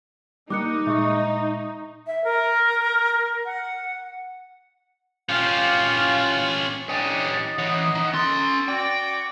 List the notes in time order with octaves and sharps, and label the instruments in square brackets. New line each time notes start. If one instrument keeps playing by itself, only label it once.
[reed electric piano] G3 A#3 [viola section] D#4 [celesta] D6 F#6 C#7
[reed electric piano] A#2 G#3 [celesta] E5 C#6
[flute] E5
A#4
F#5
[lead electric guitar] C#4 G4 [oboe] F4 [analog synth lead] F5
[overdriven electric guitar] C#4 G4 [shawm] D4 [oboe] D#5
[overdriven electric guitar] E3 C#5 [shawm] F#5
[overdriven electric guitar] D#3
[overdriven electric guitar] C#4 C6 [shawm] A4
[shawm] F#4 [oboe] D5 [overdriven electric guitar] G5